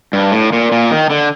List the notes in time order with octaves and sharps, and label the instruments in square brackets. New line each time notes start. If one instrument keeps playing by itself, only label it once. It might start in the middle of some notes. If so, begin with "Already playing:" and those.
[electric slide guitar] G2
A2
A#2
A#2
D#3
D3